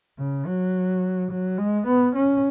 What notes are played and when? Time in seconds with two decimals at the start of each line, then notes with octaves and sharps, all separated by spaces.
0.19 C#3
0.47 F#3
1.31 F#3
1.58 G#3
1.86 B3
2.15 C#4